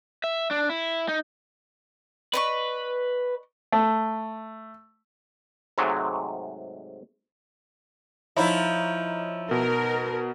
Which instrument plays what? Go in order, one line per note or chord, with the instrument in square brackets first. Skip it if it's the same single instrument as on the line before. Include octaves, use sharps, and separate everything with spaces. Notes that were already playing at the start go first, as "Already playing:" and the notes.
[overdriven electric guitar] E5
D4
E4
D#4
[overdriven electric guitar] B4 [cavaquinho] D5 D#5 C#6
[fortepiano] A3
[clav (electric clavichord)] G#2 C3 F#3 G#3 A3
[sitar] F3 E4 [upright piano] D#4 C#5 A#5
[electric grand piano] B2 [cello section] A#4